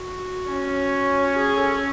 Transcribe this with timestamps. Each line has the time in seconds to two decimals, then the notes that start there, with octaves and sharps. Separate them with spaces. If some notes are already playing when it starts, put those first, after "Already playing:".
Already playing: F#4
0.48 C#4
1.25 F#4
1.36 G#4
1.57 A4